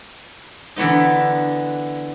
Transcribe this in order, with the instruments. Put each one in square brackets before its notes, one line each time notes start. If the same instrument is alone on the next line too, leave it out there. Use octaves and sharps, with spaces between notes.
[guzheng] D3 E3 B3 D#4